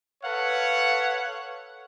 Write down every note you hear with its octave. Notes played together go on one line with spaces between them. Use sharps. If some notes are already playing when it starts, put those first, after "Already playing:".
A4 B4 C#5 F5 F#5